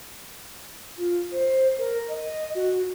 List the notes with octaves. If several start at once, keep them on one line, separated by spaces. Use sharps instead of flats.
F4
C5
A#4
D#5
F#4